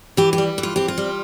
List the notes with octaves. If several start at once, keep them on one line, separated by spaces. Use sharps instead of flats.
E3 G4
G4
G3
E3
F4
C4 G4
F4
G3